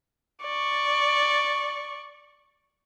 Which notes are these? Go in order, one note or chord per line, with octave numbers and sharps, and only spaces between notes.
D5 C#6